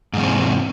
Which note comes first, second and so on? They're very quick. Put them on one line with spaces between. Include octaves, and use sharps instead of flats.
G#2 E2 C3